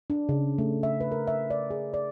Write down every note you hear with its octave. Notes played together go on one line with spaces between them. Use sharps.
D4
C#3
A3
E5
B4
A#4
E5
D5
G#4
D5